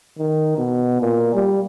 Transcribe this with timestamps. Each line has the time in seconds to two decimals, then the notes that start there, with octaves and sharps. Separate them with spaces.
0.19 D#3
0.58 B2
1.01 A#2
1.34 G3